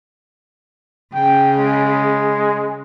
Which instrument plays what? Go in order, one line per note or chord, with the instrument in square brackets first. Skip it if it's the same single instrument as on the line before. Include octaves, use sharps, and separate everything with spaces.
[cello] C#3 [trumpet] G5
[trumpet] G#3